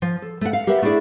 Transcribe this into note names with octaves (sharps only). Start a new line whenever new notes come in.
F3
A4
A3 F#5
F5
G4 A#4 B4 E5 F#5
A3 D4 E4 G#4 D5 E5